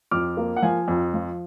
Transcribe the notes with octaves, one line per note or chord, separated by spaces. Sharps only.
F2 D6 F6
A#3
F#5
F3 F5 G#5
F2
F3